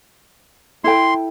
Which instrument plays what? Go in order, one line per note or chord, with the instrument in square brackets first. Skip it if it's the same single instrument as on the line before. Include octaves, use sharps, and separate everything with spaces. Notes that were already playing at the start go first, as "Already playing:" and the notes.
[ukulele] E4 A4 G5 [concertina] C6